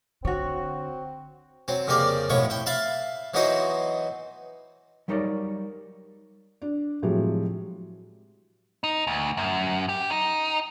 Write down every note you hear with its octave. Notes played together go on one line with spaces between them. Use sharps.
D3 C4 F#4 C#5
F#3 C4
F2 C#3 A#3 G4 D5
B1 A2 F3 E4 C#5 C#6
E4 G5
E5 F5 A5 B5
E3 F#3 B3 D#4 F#4 C5
F#3 G3 D#4 A#4 C#5 D5
D4
A2 C3 F3 F#3 G#3 G4
D#4
D2
F#2
G4
D#4